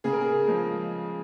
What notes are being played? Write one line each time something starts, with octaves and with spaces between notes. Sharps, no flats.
C#3 G#4
A#4
G#4
F3 G#3